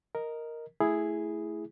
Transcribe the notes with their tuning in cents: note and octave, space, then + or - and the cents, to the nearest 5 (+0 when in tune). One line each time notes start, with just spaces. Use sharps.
A#4 +0 D#5 +0
A3 +0 E4 +0 G#4 +0